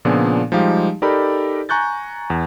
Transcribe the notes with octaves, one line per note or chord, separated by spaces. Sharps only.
A#2 C#3 F3 B3 D4 G#4
F3 G3 G#3 D#4 G4 F5
D#4 G4 A4 A#4 D5 B5
G#5 A#5 C#6 F#6 G6 A6
E2